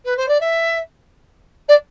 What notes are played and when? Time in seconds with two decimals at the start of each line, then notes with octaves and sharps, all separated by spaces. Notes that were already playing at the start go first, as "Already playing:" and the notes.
0.05 B4
0.16 C5
0.28 D5
0.40 E5
1.68 D5